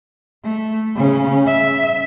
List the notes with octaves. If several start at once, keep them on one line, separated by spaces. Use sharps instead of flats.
A3
C#3 C#4
E5